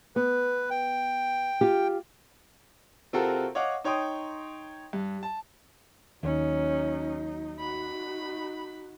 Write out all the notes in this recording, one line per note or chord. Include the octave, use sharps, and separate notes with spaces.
B3 B4
G5
F4 G4
C3 C4 F4 F#4 A4 A#4
C#5 D#5 F5 F#5 D6
D#4 C#5 G5 C6 D#6
G2
A5
D#2 F#3 C#4 D#4
D#4 F#4 B5